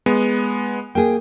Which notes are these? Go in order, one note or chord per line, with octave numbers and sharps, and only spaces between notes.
G#3 B3
A#3 G#4 G5